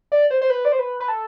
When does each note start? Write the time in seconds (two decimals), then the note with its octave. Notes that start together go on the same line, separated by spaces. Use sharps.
0.12 D5
0.31 C5
0.42 C5
0.50 B4
0.65 D5
0.72 C5
0.79 B4
1.00 B4
1.08 A4